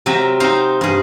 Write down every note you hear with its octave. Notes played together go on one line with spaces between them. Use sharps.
C3 F#3 C4 A#4 E5
C4 D#4 C5 F5
G2 G#4